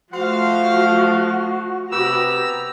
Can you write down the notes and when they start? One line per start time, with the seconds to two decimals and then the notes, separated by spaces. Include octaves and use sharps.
0.12 F3 A3 F#4 C5 F5
1.91 C3 B3 G4 A#5 E6